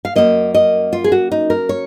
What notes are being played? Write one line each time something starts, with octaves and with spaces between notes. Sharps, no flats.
F5
F#2 D#3 A#3 D#5
D#5
F4
G#4
F#4
D#4
A#4
C#5